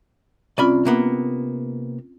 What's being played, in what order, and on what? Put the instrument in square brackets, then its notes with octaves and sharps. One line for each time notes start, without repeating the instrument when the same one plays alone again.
[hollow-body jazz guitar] C2 D5 B5 [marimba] C4 C#4 F4
[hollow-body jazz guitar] C3 A#3 B3